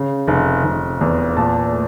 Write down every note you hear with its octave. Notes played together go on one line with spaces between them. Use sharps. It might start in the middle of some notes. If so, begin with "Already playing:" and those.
Already playing: C#3
F1
F1
E2
A#2 A5
A3